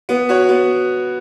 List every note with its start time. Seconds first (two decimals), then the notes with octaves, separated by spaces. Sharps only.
0.09 B3
0.29 F#4 C#5
0.49 B3